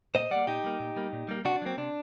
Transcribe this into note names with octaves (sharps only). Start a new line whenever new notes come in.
A#2 C5 D#5
G3 A#3 D5 F#5
A#2 D#4 G4
G3 A#3
A#2
G3 A#3
A#2
G3 A#3
C3 D4 F#4
D4
F#3 A#3 C4
C3 D4